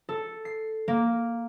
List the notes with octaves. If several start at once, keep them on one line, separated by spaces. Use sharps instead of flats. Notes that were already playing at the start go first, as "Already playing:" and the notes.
A4
C7
A#3